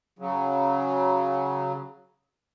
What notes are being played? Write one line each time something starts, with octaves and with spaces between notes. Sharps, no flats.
C#3 F#3